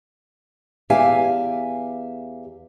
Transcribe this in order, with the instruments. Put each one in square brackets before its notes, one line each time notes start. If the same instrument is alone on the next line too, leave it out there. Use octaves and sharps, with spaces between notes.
[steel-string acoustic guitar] E2 G4 E5 F5 G#5